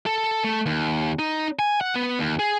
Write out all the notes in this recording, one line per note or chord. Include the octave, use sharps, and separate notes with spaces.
A4
A3
D#2
D#4
G#5
F#5
B3
D#2
G#4